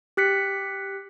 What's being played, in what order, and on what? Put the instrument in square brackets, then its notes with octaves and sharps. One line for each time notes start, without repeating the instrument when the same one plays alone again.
[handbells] G4 F#6 B6 C#7